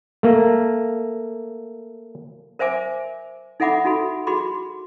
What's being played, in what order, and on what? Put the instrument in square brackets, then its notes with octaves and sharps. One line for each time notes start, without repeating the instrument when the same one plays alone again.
[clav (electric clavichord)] A3 A#3
[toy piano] A#4 C5 E5 G#5 D6
D#4 A4 E5 F#5 B5 D6
D#4 F#4 A4 B5
F#4 G#4 B5 C6 D6